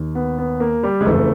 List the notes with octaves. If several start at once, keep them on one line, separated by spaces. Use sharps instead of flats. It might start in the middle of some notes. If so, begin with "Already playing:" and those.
Already playing: D#2 D#3
B3
B3
A#3
G3
G#3
F#1 F2 C#3 E3 A3